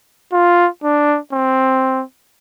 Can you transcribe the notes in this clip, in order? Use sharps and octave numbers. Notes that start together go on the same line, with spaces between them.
F4
D4
C4